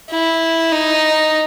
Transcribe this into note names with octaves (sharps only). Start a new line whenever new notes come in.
E4
D#4